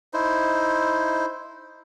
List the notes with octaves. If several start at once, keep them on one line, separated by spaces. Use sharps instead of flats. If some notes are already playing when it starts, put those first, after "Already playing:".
D#4 E4 C5